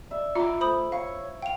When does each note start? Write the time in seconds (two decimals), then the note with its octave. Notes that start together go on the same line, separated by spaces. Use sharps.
0.11 D5 E5
0.35 E4 F4 A#5 D6
0.61 A3 C5 B5 D#6
0.92 C#5 F5 C#6
1.42 F5 G5 F7